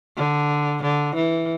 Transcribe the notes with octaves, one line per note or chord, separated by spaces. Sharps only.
D3
D3
E3